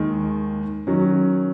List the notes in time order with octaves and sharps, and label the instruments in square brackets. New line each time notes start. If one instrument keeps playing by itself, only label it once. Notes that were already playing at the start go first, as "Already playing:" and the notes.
Already playing: [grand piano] D#2 D#3 G#3
D#3 F#3 C#4